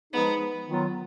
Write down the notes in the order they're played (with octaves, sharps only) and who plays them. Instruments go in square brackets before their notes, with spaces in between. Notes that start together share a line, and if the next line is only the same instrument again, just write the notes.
[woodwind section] F3 G#3 D#4 G#4 [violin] B3
[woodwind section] D#3 F#3 B3 F4